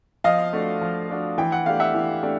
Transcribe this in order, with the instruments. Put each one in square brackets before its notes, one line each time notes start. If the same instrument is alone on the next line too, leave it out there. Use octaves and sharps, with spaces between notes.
[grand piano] F3 [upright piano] D#5 F5
[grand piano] A3 D4 F#4
F3
A3 D4 F#4
[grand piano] E3 [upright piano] G5
[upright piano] F#5
[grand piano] A3 D4 G4 [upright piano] F5
[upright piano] E5 F#5
[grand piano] E3
A3 D4 G4